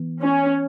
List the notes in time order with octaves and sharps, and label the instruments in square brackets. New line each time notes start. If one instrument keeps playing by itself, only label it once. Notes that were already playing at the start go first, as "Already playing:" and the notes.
Already playing: [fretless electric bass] E3 B3
[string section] C#4